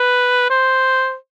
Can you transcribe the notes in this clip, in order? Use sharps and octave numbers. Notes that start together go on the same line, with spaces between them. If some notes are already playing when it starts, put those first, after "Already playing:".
Already playing: B4
C5